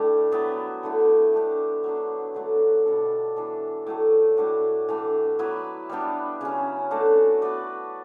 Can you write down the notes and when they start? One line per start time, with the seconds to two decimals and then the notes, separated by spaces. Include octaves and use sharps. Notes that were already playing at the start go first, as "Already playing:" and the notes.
Already playing: A2 G3 A3 D4 G4
0.32 F#3 B3 E4 G4
0.83 D3 A3 E4
1.33 A3 D4 G4
1.84 F#3 B3 D4
2.34 D3 F#3 A3 D4
2.86 B2 G3 D4 A4
3.36 E3 B3 D4 A4
3.87 A2 F#3 A3
4.37 A2 G3 D4 F#4
4.89 E3 A3 D4
5.39 F#3 B3 E4 B4
5.89 G3 B3 D4 G4
6.41 C#3 F#3 C#4
6.91 A3 D4 F#4 A4
7.42 B3 F#4 B4 D5